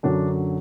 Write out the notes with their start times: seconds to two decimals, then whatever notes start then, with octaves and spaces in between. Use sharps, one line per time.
0.03 F#2 D3 F#3 D4